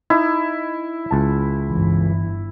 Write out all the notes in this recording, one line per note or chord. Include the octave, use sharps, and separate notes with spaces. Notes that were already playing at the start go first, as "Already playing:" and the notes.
D#4 E4
C#2 A5
G1 G2 E3